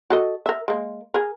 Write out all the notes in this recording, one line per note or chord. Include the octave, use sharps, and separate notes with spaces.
F#4 A4 D#5
A#4 E5
G#3 A#3
G#4 A#4